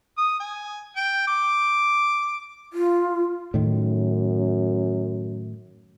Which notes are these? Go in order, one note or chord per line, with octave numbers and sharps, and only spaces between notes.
D#6
G#5
G5
D6
F4
F#2 A2 D#3